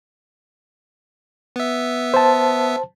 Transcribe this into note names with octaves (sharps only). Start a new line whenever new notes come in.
B3 E5
C5 A5